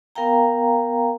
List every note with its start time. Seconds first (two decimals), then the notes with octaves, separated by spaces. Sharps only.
0.15 B3 A#4 F5 G5 A#5